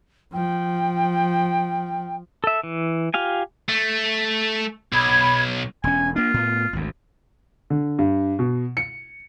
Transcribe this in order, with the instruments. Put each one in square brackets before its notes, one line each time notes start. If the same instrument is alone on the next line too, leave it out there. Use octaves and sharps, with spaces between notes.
[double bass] F3 [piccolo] G5
[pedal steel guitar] A4 E5
E3
F4 G4 F5 G#5
[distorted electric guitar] A3
[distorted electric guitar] B1 [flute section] B5 G#6
[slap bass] E1 C#4 [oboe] G#5
[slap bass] A#3 D4 [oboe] F4
[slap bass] A2 B3
G#1 D2
[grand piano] D3
G2
B2
C#7